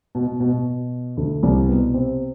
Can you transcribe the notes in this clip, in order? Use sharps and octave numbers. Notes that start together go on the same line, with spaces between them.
B2
B2
B2
B2
D2 D3
C2 C3
B2 B3
C3 C4